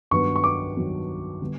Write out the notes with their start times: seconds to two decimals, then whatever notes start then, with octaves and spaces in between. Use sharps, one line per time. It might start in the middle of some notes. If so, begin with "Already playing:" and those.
0.11 G2 D#3 F#3 B3 C#6
0.36 C#6
0.44 D6
0.76 G2 D#3 F#3 B3
1.42 D3 G3 B3